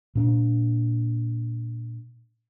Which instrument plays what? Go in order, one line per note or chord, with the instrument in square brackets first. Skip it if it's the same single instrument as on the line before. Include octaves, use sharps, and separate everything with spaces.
[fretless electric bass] A#2 D4